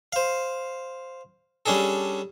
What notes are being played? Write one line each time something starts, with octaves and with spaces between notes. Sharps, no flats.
C5 F5
G3 C#4 D4 G#4 A4